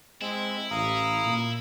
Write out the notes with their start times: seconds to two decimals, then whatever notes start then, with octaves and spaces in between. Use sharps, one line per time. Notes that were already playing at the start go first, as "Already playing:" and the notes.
0.21 G#3 C4 E4
0.71 A1 F5 A#5 D#6
1.25 A#2